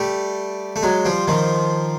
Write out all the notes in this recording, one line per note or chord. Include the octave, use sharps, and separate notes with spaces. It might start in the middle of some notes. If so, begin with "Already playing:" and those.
Already playing: G3 A3
A3
F#3 G#3
F3 G3
D#3 F3